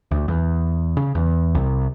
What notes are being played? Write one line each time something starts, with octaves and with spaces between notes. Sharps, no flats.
D2
E2
C#3
E2
C2